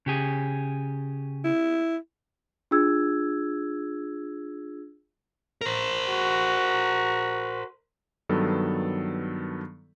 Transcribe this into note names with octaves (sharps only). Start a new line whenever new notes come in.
C#3 G4 G#4
E4
D4 F4 G#4 E6 G#6
A#4 C5
F#4
G2 D#3 F#3 B3 A4